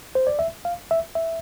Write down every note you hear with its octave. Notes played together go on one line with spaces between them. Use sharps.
C5
D5
E5
F5
E5
E5